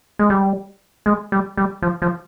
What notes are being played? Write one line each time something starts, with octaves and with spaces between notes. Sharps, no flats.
G#3
G3
G#3
G3
G3
F3
F3